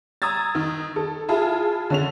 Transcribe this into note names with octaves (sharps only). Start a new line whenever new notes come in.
A#5 D#6 E6 G#6 A6
D#3
A4
E4 F4 G#4 A5
D3 C#4 F7